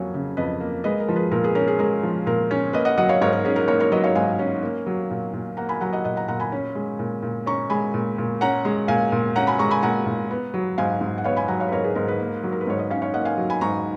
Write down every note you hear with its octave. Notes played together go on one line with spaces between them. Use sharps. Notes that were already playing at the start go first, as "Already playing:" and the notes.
Already playing: F2 C#3 F#3 A#3 C#5 F5 G#5
C#3
F2 B4 D#5
A#3
G#3 B4 D#5
A#4
F3
G#4 B4
A#2 A#4
G#4 B4
C#4 A#4
G#4
G#3 A#4
F3
A#2 A#4
C#4
A#3 B4 D#5
D#5 F#5
F#3 D#5 F#5
C#5 F5
G#2 A#4 C#5
A#4
C#4 G#4
A#4
A#3 A#4 C#5
A#4 C#5
F#3 B4 D#5
C#5 F5
G#2 F5 G#5
C#4
A#3
F#3
A#2
A#2
A#3 F#5 A#5
G#5 B5
F#3 F#5 A#5
D#5 F#5
A#2 D#5 F#5
F#5 A#5
A#2 F#5 A#5
G#5 B5
C#4
G#3
A#2
A#2
C#4 A#5 C#6
G#3 G#5 B5
A#2
A#2
C#4 F#5 A#5
G#3
A#2 F5 G#5
A#2
C#4 F#5 A#5
G#5 B5
G#3 A#5 C#6
G#5 B5
A#2 F#5 A#5
A#2
B3
F#3
G#2 F5 G#5
G#2
F#5
B3 C#5 F5
G#5 B5
F#3 F#5 A#5
C#5 F5
B4
G#2 A#4 C#5
G#4 B4
G#2 A#4
G#4 B4
A#3
F#3
A#4
B4
G#2 C#5
B4 D#5
C#4 C#5 F5
C#5 F5
A#3 D#5 F#5
F5 G#5
F#3
G#5 B5
G#2 A#5 C#6